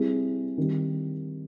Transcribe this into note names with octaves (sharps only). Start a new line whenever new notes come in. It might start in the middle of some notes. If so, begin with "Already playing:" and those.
Already playing: G3 C4 E4 G#4
D#3 G3 C4